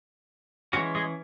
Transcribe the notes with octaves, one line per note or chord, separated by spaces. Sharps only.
E3 G#3 C#4 F#4
G#3 G#4